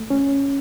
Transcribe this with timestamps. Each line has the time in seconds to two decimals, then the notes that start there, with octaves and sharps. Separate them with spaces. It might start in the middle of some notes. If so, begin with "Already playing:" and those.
Already playing: A3
0.10 C#4